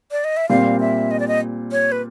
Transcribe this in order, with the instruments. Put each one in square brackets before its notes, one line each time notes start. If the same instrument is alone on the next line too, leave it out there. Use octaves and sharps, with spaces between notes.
[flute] D5
D#5
E5
[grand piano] A#2 G3 C4 [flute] F5
[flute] E5
D#5
D5
D#5
C#5
B4